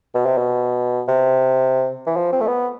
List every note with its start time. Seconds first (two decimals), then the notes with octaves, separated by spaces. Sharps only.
0.14 B2
0.26 C3
0.37 B2
1.08 C3
2.06 E3
2.16 F3
2.32 C4
2.41 A3
2.47 B3